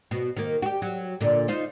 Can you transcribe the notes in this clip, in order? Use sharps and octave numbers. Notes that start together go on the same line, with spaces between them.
B2
D#3 A#3
F#4 G4
F#3
A#2 D3
D#4 F4 C5